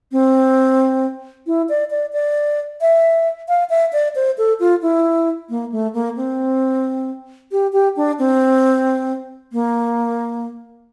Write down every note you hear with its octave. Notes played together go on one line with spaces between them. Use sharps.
C4
E4
D5
D5
D5
E5
F5
E5
D5
C5
A4
F4
E4
A#3
A3
A#3
C4
G4
G4
D4
C4
A#3